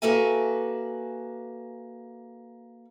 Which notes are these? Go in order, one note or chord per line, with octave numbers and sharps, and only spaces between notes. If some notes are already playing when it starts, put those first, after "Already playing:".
A#3 F#4 A4 B4 E5 G#5